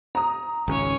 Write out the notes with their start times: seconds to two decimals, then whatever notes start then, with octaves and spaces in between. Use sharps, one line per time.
0.15 A#5 D#6
0.68 G#1 C#2 C#4 C#5